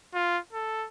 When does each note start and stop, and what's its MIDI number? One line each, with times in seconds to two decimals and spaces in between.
0.14 0.38 65
0.53 0.88 69